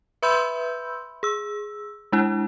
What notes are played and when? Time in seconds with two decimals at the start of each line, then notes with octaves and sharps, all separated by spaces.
0.22 B4 E5 B5 C6 E6 G6
1.23 G#4 E6
2.12 G#3 D4 E4